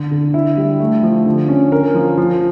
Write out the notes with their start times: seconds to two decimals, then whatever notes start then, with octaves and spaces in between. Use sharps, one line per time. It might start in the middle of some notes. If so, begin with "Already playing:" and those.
Already playing: D3
0.11 D3
0.34 E4
0.57 G3
0.80 A3
1.03 F3
1.26 D3
1.49 C#4
1.72 A#4
1.94 F3
2.17 F3